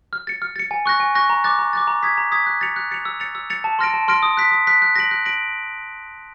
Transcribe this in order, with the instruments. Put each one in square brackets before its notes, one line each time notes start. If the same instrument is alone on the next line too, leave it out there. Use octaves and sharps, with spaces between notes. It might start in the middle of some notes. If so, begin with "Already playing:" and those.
[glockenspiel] F6
A6 C#7
F6
A6 C#7
G#5
C#6 F#6 A#6
G#5
C#6 F#6 A#6
A#5
D6 F#6 A6
A#5
D6 F#6 A6
A#5
D#6 G#6 B6
A#5
D#6 G#6 B6
F#6
A6 C#7 F7
F#6
A6 C#7 F7
E6
A6 C#7 F7
E6
A6 C#7 F7
A5
C6 F6 A#6 D7
A5
C6 F6 A#6 D7
D#6
F#6 B6
D#6
F#6 B6
F#6
A#6 D7 F#7
F#6
A#6 D7 F#7